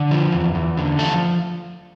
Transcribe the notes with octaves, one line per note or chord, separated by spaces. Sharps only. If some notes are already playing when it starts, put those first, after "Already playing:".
Already playing: D3
F3
E2
E2
D3
F3 A3 A4